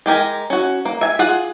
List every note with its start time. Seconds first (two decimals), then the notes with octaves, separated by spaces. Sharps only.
0.06 G#3 G4 A#4 G#5
0.50 C#4 F#4
0.85 A#3
1.01 E5 G#5
1.19 F4 G#4 F#5